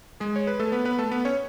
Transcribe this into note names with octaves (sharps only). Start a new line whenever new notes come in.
G#3 G#4
C#5
B4
A3 A4
B3 B4
B3 B4
A3 A4
B3 B4
C#4 C#5